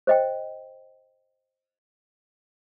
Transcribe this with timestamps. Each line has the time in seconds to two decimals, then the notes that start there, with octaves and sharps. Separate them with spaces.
0.07 C5 D#5 G5